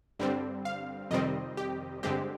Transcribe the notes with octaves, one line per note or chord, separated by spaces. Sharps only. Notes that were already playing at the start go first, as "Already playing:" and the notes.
G2 D3 G3 C4
F5
F2 C3 D#3 G3 C4 D#5
G4
G2 D3 G#3 C4 G4